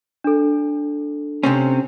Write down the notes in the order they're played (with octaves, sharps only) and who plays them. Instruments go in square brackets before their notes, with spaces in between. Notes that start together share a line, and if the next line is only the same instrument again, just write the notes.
[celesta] D4 A4
[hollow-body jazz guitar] C3 C4 C#4